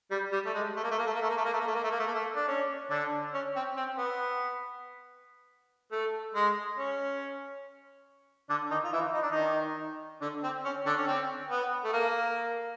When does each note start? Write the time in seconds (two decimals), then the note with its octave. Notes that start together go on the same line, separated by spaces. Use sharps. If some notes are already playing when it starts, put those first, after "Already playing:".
0.11 G3
0.32 G3
0.46 A3
0.54 G#3
0.76 A3
0.84 A#3
0.91 A3
0.98 A#3
1.06 A3
1.14 A#3
1.22 A3
1.29 A#3
1.37 A3
1.45 A#3
1.53 A3
1.60 A#3
1.68 A3
1.75 A#3
1.84 A3
1.91 A#3
1.99 A3
2.07 A#3
2.14 A3
2.36 D4
2.48 C#4
2.90 D3 D4
3.34 C#4
3.56 C4
3.77 C4
3.98 B3
5.92 A3
6.35 G#3
6.78 C#4
8.49 D3 D4
8.71 D#3 D#4
8.84 F4
8.93 E3 E4
9.14 D#4
9.22 D4
9.32 D#3 D#4
10.21 D3 D4
10.43 C4
10.65 C#4
10.86 D3 D4
10.97 C#4
11.07 C4
11.51 B3
11.84 A3
11.93 A#3